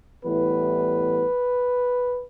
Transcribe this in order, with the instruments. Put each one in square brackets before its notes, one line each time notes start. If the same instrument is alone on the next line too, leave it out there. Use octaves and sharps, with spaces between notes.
[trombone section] A2 E3 G3 B3 B4